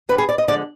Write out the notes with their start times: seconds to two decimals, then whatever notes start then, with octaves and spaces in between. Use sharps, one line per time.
0.09 D3 G3 B4
0.18 G#4
0.29 D5
0.38 D#5
0.48 D3 F3 G#3 D5